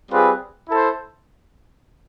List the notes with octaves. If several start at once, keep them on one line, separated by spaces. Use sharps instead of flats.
G3 C4 F4 G#4 B4
E4 A4 C5